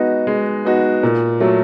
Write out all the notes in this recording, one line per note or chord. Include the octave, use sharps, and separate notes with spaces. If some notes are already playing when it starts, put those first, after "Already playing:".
Already playing: G#3 B3 D#4 F#4
G#3
B3 D#4 F#4
A#2
F#3 A3